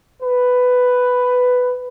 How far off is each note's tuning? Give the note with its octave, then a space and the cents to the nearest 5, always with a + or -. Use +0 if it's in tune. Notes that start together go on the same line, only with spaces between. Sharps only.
B4 +10